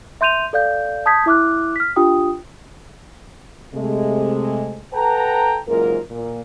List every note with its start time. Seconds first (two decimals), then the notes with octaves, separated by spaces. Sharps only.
0.21 E5 C6 G6 D#7 F7
0.53 A4 D5 F5 G6
1.06 A5 D#6 G6 G#6 B6
1.26 E4 E5 D6 F6 F#6
1.76 F6 B6
1.96 D4 F4 G4 G5 D#6
3.74 C3 G#3 A3
4.93 A4 B4 F#5 G5 A5 A#5
5.68 F#1 G#2 F4 A#4
6.11 A#2